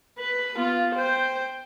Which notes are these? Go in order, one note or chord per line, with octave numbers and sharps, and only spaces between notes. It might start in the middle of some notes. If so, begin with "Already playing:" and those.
B4
B3 F4
C5 G5